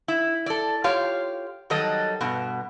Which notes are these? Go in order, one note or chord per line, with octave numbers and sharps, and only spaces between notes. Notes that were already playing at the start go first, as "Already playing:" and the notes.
E4
A4 D5
F4 G4 C#5 F5
D#3 F#3 G3 A4 D#5
G2 B2